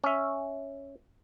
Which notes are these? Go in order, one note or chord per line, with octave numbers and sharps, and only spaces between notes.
C#4 E5